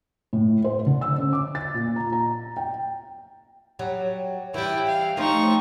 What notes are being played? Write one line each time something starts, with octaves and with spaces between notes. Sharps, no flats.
A2
C5
D3
E6
C#4
D6
A6
A#2
A#5
A#5
G5
F#3 G3
E3 G3 E4 G5
F5
F3 A3 C4 D#4 C#6